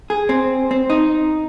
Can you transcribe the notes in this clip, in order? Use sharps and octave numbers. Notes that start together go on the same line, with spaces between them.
G#4
C4
C4
D#4